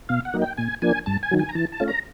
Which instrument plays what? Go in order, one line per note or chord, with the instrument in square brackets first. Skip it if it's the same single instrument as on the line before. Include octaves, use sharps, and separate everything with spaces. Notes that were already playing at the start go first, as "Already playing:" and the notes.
[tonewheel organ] B2 F5
F#5
F#3 A#3 D#4
G5
A#2 G#5
F3 A#3 D4 G#5
G2 A5
G#5
D#3 F#3
G#5
A#5
E3 A5
A5
A3 C#4 F4
A#5